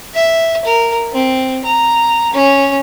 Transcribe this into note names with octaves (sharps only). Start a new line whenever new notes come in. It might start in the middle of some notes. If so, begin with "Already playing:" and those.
E5
A#4
C4
A#5
C#4